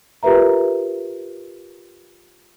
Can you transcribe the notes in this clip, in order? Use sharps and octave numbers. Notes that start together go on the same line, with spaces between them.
F4 G4 A#4 B4 E5 A#5